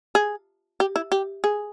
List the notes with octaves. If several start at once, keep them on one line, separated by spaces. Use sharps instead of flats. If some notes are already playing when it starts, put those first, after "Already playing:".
G#4
G4
E4
G4
G#4